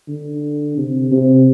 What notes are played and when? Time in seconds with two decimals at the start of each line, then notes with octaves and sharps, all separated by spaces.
0.08 D3
0.77 C3
1.12 C3